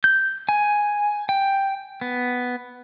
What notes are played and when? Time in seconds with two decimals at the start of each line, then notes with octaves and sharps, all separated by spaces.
0.04 G6
0.49 G#5
1.29 G5
2.01 B3